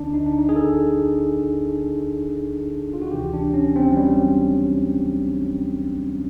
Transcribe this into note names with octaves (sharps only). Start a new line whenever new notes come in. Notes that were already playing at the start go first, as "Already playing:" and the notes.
Already playing: D2 D3 D4
D#4
D4
D#4
G#4
A4
F4
F#4
D2 C3 E3 G4
D4
C#4
C4
F#3
G3